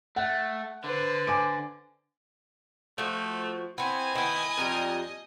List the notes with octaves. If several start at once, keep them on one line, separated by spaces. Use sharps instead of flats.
A3 F#5
D3 B4 C5
G#5 D6 D7
F3 A3 F#4
B3 C4 E4 G#5
D#3 B3 E4 D#5
F2 G3 F4 A#4